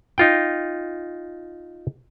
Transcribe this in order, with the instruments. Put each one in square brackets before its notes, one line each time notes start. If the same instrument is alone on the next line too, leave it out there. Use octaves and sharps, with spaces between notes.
[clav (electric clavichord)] D#4 F4 G5